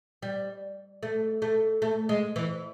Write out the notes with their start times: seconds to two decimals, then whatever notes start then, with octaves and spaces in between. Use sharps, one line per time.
0.22 G3
1.03 A3
1.42 A3
1.82 A3
2.09 G#3
2.36 E3